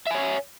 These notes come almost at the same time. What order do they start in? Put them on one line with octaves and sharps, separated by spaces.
E5 G#5 C#5